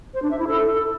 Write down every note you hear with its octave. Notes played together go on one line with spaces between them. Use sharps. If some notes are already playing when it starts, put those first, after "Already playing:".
C5
D4
E5
E4
A4